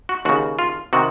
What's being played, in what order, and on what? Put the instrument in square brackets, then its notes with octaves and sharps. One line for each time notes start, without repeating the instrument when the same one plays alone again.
[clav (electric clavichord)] F#4
D#2 C#3 F#4
F4
C3 D#3 F#4